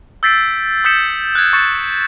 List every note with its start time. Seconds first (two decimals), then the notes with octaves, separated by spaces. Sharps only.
0.23 E6 G6 A6 B6 C7 D7
0.84 D#6 E6 G6 B6 C#7 E7
1.35 F#6 G#6
1.53 C#6 G#6 A6 C#7